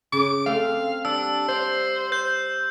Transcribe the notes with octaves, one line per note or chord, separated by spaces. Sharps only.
C#3 D6
A3 C4 A4 F5
G3 D4 E6
C5 D5 F5
C5 G6